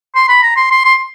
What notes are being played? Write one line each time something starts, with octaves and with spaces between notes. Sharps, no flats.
C6
B5
A#5
C6
C6
C6